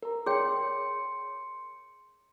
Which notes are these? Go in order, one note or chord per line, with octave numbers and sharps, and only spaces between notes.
A#4 A#5
G#4 C#5 G5 C6 C#7